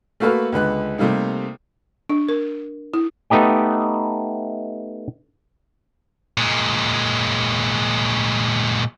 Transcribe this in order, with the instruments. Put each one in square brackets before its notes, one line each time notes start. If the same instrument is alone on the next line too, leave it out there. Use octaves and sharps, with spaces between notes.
[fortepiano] A3 A#3 F#4 A4 B4 F6
C#2 D3 B4 F#6
C3 G3 A3 A#3 D#4
[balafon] D4
A#4
E4
[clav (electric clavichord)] A3 B3 D#4 G4 G5
[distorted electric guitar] A#2 G#3